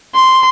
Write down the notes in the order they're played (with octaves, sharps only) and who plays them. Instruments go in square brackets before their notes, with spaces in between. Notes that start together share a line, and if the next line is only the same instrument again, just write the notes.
[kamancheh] C6